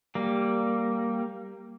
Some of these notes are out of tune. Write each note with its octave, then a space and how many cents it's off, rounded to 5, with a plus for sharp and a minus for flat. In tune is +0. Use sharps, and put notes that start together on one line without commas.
G3 +0 A#3 +0